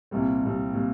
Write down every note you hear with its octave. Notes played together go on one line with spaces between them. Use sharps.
C2 A#2 G3 C4
C2 A#2 G3 C4
A#2 G3 C4